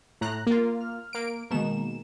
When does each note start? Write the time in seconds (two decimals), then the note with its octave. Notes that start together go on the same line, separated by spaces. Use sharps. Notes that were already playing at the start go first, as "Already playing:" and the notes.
0.21 A2 A#5 F#6
0.46 A#3 F4 A#4
0.80 F6
1.13 A#3 D7
1.51 B2 D#3 G#3 A#3 E7